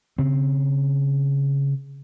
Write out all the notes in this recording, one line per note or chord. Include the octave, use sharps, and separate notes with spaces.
C#3 C4